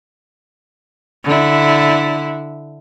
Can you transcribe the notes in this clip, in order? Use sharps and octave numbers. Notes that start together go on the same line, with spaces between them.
D3 E4